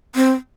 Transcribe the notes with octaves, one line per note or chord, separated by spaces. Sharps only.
C4